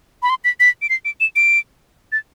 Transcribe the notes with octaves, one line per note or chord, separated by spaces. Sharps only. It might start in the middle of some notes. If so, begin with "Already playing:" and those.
B5
C6
B6
B6
D7
C7
D7
E7
D7
A6